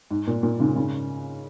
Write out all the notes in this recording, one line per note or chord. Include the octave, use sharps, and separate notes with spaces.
G#2
A#2
A#2
G#2 C#3
G#2 C#3